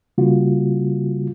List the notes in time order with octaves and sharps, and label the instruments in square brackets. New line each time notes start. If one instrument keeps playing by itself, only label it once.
[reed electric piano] C#3 G3 A#3 F4 F#4